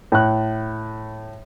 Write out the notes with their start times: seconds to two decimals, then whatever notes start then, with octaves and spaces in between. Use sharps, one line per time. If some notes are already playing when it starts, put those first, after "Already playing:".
0.12 A2 F#6